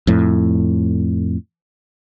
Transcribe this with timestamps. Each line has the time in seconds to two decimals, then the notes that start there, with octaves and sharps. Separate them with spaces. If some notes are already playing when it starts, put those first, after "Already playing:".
0.07 F2 A2